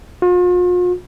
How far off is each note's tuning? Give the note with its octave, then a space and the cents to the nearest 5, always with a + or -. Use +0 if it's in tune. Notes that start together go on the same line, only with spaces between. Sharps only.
F4 +45